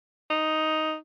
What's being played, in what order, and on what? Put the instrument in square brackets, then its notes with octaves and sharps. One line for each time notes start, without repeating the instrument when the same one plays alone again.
[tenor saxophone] D#4